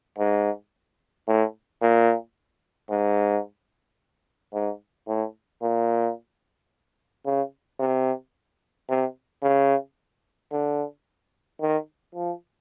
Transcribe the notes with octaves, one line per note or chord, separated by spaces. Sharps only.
G#2
A2
A#2
G#2
G#2
A2
A#2
C#3
C3
C3
C#3
D3
D#3
F3